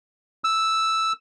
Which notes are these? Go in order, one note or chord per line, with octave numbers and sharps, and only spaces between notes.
E6